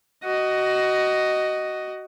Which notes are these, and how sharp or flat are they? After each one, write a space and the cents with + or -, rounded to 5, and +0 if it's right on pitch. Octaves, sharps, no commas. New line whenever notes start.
F#4 +20 D#5 +0